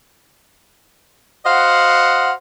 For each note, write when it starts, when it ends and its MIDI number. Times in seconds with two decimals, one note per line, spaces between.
1.46 2.31 66
1.46 2.31 72
1.46 2.31 75
1.46 2.31 77
1.46 2.31 78